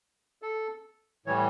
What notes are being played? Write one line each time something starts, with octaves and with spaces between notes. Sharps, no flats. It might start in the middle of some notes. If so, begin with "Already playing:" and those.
A4
A2 E3 G3 C#5